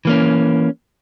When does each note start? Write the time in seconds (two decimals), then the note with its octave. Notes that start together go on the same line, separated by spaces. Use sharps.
0.05 E3 A#3 C#4